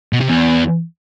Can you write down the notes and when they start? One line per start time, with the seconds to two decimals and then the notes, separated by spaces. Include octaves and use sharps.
0.13 B2
0.21 C3
0.29 E2